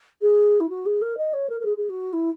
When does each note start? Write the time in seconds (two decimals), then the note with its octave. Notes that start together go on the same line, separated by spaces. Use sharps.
0.21 G#4
0.60 E4
0.69 F#4
0.85 G#4
1.01 A#4
1.17 D#5
1.33 C#5
1.49 A#4
1.60 A#4
1.65 G#4
1.77 G#4
1.89 F#4
2.13 E4